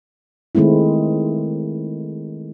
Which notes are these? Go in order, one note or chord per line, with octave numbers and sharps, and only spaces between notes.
D#3 G#3 A3 C4 E4